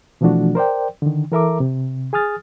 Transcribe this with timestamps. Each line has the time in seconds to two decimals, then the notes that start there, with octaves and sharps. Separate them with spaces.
0.21 B2 E3 F3 A3 D4 F#4
0.55 A#4 C5 D5 G5
1.02 D3 D#3
1.31 E3 A4 A#4 E5 A#5 D6
1.60 C3
2.13 G#4 G#5 D#6 F6 A6